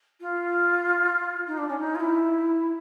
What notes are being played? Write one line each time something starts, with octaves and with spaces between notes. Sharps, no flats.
F4
D#4
D4
C#4
D#4
F4
E4